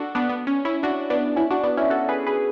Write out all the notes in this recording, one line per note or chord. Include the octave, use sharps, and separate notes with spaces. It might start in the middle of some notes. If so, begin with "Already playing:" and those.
Already playing: D4 F#4 A4
B3 D4
B3
C#4
C#4 E4
D4 F#4
B3 D4
C#4 E4
D4 F#4
B3 D4
C#4 E4
F#4 A4
G#4 B4
G#4 B4